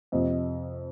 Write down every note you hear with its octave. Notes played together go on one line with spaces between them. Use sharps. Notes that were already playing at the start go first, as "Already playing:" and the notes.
F2 C3 F3 D#5